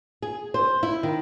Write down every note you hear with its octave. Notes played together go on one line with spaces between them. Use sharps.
G#4
C5
E4
D#3